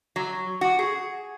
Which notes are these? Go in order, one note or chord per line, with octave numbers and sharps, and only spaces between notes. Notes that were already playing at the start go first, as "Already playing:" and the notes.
F#3
F#4
G#4